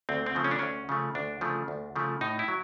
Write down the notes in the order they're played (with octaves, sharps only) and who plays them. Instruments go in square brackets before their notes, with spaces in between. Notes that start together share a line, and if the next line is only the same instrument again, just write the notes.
[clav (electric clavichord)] D2 C4
C4
C#3 F3 A3
C#4
D4
D2 C#4
C#3 F3 A3
D2 D4
C#3 F3 A3
D2
C#3 F3 A3
A2 D#4
E4
F#3